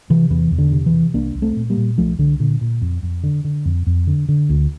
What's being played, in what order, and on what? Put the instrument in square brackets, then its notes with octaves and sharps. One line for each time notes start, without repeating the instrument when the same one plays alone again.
[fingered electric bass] C3 E3
E2 E3
E2
D3
C3
E3
C3
C2 A#3 D4
C2
A3 C4
A#2
G3 A#3
A#2
C2 F3 A3
C2 D3
A#2 D3
A#2
F2
F2
D3
D3
F2
F2
D3
D3
D2